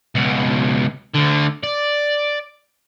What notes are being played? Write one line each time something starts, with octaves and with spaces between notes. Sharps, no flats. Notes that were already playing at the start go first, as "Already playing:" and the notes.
C#2 B2
D2 D3
D5